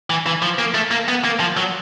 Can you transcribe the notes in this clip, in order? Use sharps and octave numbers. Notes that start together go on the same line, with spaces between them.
E3
E3
F3
A#3
A3
A#3
B3
A#3
F3
F#3